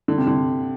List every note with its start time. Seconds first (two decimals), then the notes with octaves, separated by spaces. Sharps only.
0.08 D3
0.18 C3
0.27 D3